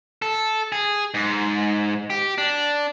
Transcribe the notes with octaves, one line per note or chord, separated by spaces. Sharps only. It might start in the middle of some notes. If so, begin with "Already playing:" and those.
A4
G#4
G#2
G4
D4